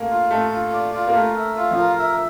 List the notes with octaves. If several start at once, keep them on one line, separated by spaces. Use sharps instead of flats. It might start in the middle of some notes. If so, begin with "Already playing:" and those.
Already playing: A3 A#3
F4
A3 A4
F4
D5
F4
A#3
A3 A#4
E5
F4
F3
A#4
E5